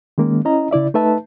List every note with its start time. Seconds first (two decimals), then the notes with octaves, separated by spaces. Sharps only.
0.18 D#3 G#3 A#3 C#4
0.45 C#4 E4 D#5 A#5
0.71 C#3 E4 D5 E5
0.94 A3 D#4 B4 E5 A5